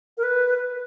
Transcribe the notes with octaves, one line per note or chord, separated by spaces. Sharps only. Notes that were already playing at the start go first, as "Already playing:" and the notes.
A#4
B4